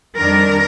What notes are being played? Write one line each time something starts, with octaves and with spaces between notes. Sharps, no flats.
F2 D#3 G3 D4 A#4